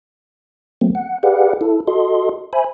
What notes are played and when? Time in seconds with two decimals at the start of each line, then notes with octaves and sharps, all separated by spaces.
0.81 F#3 A3 A#3 C4
0.95 F#5
1.23 G4 G#4 B4 D5 F5 F#5
1.61 E4 A4
1.87 F#4 A4 D#5 C6
2.53 C5 E5 G#5 B5